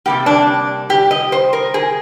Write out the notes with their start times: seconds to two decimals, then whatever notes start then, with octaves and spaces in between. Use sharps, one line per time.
0.06 C3 G3 A#3 G4
0.26 D4
0.90 G4
1.11 D#5
1.32 C5
1.53 A#4
1.74 G#4